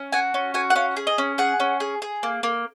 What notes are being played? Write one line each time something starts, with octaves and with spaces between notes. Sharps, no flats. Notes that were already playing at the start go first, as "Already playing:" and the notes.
Already playing: C#4
F#4 G#5
C#4
F#4 G#5
F#5
C#4 F5
G#4
D#5
C#4
G#4 F#5
C#4
G#4
G#4
A#3
A#3